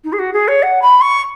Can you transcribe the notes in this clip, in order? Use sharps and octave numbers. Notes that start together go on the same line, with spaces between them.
D#4
G#4
F#4
G#4
C#5
F#5
B5
C#6